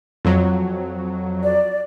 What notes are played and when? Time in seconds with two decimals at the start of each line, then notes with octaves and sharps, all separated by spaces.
0.25 F2 F#3
1.43 D5